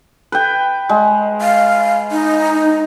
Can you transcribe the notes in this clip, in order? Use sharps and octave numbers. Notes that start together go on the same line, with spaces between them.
B4 G5
G#3
F5
D#4